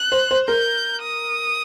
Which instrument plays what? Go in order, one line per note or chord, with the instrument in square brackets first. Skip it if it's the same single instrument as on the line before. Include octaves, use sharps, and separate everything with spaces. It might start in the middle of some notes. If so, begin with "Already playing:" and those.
Already playing: [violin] F#6
[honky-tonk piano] C5
C5
[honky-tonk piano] A#4 [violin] G6
[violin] D#6